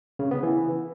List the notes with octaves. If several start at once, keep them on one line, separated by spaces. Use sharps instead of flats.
C#3
B3
E3